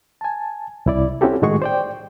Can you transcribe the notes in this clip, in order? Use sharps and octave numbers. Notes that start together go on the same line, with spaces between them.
G#5 A5
C2 E4 D5
C4 C#4 E4 F#4 G4 A4
A2 D#3 G#3 F#4 G#4 C#6
C5 D5 G5